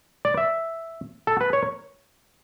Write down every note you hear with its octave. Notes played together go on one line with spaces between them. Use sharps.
D5
E5
A4
B4
C#5